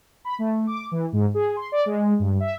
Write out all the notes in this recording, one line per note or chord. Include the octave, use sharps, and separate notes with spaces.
B5
A3
D6
E3
G#2
G#4
C6
D5
G#3
G2
E5